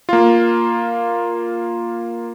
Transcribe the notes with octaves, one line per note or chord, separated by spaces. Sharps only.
A#3 F4